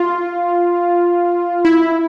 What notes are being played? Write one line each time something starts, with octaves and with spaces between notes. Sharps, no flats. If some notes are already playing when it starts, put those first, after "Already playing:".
Already playing: F4
E4